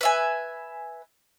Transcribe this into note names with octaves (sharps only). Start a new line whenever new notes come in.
B4 E5 G#5